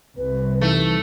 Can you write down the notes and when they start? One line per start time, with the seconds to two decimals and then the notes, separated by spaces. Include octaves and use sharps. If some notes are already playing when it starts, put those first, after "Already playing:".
0.17 C2 B4
0.61 E3 A3 D#4